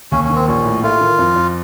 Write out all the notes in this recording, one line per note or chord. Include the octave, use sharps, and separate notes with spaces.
D#2 C#4
C#4
D#3
C4
A#1 C#4
A2
A3 F4
D#3
F2
F2